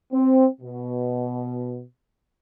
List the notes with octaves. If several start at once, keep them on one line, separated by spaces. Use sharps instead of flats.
C4
B2